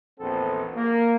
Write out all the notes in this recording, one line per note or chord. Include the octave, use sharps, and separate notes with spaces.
A#1 E2 B3 C4 A4
A#3